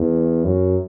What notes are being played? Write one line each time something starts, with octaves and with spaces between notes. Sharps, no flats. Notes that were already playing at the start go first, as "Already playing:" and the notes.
Already playing: E2
F#2